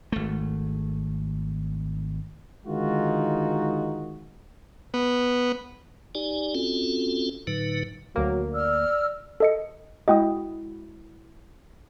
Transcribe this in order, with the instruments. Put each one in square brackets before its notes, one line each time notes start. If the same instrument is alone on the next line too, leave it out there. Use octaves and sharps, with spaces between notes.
[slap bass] G#1 A3
[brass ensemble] D3 D#3 G#3 D#4 F4 F#4
[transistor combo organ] B3
[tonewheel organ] D#4 G4 D5 G#5
C4 C#4 F4 F#4 A4
A2 D3 F#3 D#4 B4
[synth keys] D2 A#3 [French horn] F#3
[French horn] D5 [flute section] E6 F6
[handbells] A4 D#5 C#7
[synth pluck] G#3 E4 F#4 [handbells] D#5 G5 D#6